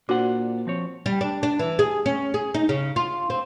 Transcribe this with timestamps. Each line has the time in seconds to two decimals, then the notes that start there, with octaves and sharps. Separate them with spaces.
0.09 A#2 D4 F#4 C5 F#5
0.67 F3 C4 C#5
1.06 G3
1.21 D4
1.43 D4
1.59 E3
1.79 G#4
2.06 C#4
2.34 G#4
2.54 D#4
2.69 C#3
2.96 F4
3.30 C4